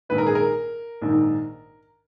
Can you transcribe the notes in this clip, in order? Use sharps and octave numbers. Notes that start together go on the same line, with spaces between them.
A#1 G#2 D#3 B4
A#4
G#4
A#4
A#1 G#2 D#3